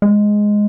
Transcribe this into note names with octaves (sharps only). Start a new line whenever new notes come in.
G#3